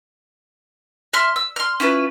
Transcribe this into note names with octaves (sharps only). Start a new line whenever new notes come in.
E5 C6 F6
E6
C6 F6
C#4 E4 F4 B4